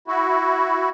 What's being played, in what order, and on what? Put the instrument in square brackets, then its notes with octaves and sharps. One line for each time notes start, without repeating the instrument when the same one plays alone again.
[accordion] E4 F#4